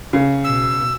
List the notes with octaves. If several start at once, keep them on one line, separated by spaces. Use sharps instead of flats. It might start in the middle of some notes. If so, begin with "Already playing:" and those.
C#3
B2 E6